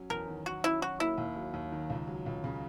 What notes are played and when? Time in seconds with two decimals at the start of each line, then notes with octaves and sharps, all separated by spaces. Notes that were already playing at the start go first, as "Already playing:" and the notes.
Already playing: F#3 C#4
0.10 E2 A#4
0.28 D#3
0.46 F#3 F#4
0.64 C#4 E4
0.81 F#3 F#4
1.00 A#3 E4
1.18 D#2
1.36 F#3
1.54 D#2
1.72 D#3
1.90 C#2
2.07 F#3
2.26 C#2
2.44 C#3